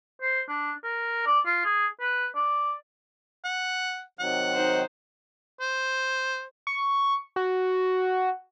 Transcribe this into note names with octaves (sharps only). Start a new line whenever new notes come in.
C5
D4
A#4
D5
F4
G#4
B4
D5
F#5
C3 D#3 F#3 F#5
D#4 C5
C5
C#6
F#4